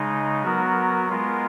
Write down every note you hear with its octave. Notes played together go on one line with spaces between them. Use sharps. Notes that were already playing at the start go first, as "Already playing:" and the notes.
Already playing: C#3 G#3 D#4
F#3 B3 F#4 A#4
G#3 B3 F4 A#4